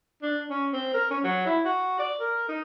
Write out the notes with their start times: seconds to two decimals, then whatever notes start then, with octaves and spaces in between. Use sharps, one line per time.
0.22 D4
0.50 C#4
0.73 C4
0.94 A#4
1.11 C#4
1.24 F#3
1.46 E4
1.65 F#4
1.99 D5
2.20 A#4
2.49 D#4